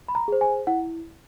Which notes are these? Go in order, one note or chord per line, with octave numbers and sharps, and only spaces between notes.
B5
A#5
G#4 C5
G#5
E4 F#5